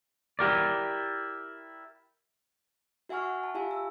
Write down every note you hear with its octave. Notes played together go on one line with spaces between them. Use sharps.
E4 G4 A#4 D5
F#4 E5 F#5 G#5 C#6 F6
F#5
A5
F4 G4 E5 F5 G#5
E6